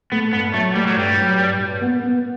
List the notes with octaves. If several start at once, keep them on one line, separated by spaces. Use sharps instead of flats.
A3 B3
G2 B3
F#3 A3
G3 A3
F#3
G2 G3
F#3
G2
G2
B3
B3